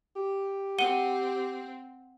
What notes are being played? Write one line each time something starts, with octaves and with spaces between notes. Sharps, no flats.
G4
C4 F#5 D#7 G7